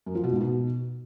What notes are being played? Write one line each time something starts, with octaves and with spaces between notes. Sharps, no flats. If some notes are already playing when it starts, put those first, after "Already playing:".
F#2
F3
B2
G#2
B2